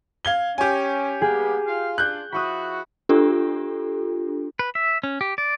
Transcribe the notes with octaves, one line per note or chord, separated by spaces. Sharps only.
F5 G#6 G7
C#4 G4 G#5
G3 A#3 B3 G#4
F4 F5
D4 F4 F#6 G6
F3 E4 F#4 B5 C#6 D#6
D4 F4 G4 A4
B4
E5
C#4
G4
D5